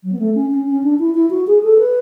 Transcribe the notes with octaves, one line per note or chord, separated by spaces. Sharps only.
F#3
B3
A3
C#4
C#4
C#4
D4
E4
E4
F#4
G#4
A4
B4